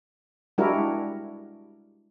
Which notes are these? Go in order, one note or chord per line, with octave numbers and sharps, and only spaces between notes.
G3 G#3 D4 E4 F#4 A#4